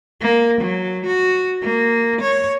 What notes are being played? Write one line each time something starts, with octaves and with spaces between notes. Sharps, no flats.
A#3
F#3
F#4
A#3
C#5